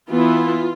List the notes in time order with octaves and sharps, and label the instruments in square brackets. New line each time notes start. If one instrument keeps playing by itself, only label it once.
[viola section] E3 B3 E4 F4